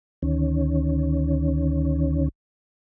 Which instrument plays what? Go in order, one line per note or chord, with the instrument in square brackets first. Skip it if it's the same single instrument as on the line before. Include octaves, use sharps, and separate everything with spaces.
[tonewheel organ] D2 D#3 C#4